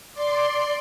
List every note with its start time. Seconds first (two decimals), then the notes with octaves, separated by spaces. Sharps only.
0.13 D5 C6